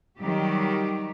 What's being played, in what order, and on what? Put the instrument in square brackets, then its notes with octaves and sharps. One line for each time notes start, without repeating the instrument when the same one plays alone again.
[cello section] D#3 F#3 G3 G4